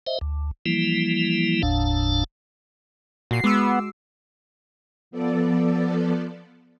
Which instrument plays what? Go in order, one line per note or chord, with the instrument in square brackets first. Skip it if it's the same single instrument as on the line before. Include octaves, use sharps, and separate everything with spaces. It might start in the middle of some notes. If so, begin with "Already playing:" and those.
[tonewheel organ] C5 D#5 E5
D2
E3 F3 G3 A#3 E4
F#1 D#2 A2 D4 F5 A5
[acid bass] A#2 [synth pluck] F#4 C7
[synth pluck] G#3 D6 E6 [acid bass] B3
[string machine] F3 B3 A4 D5